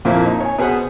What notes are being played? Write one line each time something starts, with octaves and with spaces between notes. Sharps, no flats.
F2 A#2 A#3 C4 E4
D#4
C#5 G#5
B2 B3 G#4 B4 C5 F#5